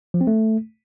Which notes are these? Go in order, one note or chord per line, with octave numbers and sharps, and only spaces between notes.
F3
C4
A3